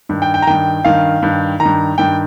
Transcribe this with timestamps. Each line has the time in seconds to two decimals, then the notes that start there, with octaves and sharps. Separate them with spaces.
0.09 G2 D#3
0.22 G5
0.34 G5
0.42 A#5
0.47 G2 D#3 G5
0.85 G2 D#3 F5
1.22 G2 D#3
1.60 D#3 A#5
1.65 G2
1.98 G2 D#3 G5